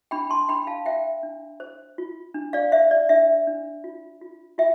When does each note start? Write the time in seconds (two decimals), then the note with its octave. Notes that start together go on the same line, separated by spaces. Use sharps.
0.11 D4 G5 B5
0.30 A5 C6
0.49 D4 G5 B5
0.67 F5 A5
0.86 C5 E5 G5
1.23 D4
1.60 C5
1.98 F4
2.34 D4
2.53 D5 F5
2.72 C5 E5
2.91 D5
3.09 D4 E5
3.47 D4
3.84 F4
4.21 F4
4.58 F4 E5 G5